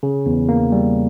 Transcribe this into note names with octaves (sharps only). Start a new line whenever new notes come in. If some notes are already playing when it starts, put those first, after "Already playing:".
C#3
E2
A#3
G3